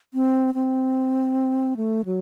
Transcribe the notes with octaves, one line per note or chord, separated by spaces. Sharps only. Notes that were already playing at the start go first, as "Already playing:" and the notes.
C4
C4
A3
F#3